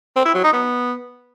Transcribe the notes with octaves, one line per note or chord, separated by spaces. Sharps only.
C4
E4
F#3
D#4
B3